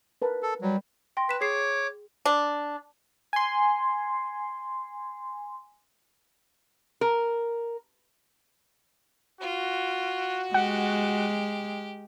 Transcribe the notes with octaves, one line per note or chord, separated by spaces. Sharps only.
A#4 B4 A5
A4
F#3 G3
G5 C6 A#6
B4 B6 E7
G#4 C#5 D6 C7
D4
G#5 C6
A#4
F4 F#4
G#3 G4 F#5